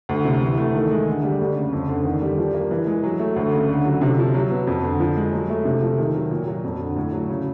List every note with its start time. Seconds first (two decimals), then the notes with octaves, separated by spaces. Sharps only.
0.09 D2
0.25 C3
0.42 E3
0.58 A3
0.75 D#3
0.91 G#3
1.07 D3
1.23 G3
1.40 D2
1.56 C#3
1.73 F2
1.89 D3
2.05 D#3
2.22 G3
2.38 F3
2.54 A#3
2.71 E3
2.87 G#3
3.03 F#3
3.19 A3
3.36 D2
3.53 C#3
3.69 D3
3.85 F#3
4.02 C3
4.18 F3
4.34 F#3
4.51 B3
4.67 F2
4.83 D3
5.00 F3
5.17 G#3
5.33 F#3
5.50 A3
5.65 C3
5.82 F3
5.98 D#3
6.15 F#3
6.31 A#2
6.47 F#3
6.64 F2
6.80 D3
6.96 A2
7.13 F#3
7.29 C#3